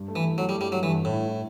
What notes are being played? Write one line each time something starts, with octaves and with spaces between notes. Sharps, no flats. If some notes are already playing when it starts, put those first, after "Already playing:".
Already playing: G2
A3
E3
E4
F#3 A3
G3
G2
G3
G2 F#3
G2 E3
G2
A2
E4
E4